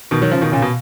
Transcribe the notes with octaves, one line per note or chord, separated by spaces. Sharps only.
B2 D#3
D#3 F#3
C#3 F3
B2 D#3
A#2 C#3
B2